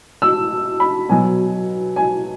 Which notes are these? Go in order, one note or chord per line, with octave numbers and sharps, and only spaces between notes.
E6
B5
B2 F#3 G#5
G#5